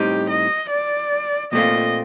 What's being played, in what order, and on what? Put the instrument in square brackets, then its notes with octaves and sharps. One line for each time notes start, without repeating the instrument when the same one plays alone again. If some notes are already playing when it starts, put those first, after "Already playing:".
Already playing: [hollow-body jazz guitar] A2 G3 C4 D#4 [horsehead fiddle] G4
[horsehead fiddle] D#5
D5
[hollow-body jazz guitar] A#2 A3 C4 F4 [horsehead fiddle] D#5